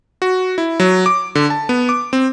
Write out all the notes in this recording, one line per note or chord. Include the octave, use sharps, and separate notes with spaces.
F#4
E4
F#3
D6
D3
A5
B3
D6
C4